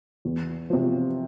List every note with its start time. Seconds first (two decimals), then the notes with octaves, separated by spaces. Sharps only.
0.25 E2
0.70 C3 F3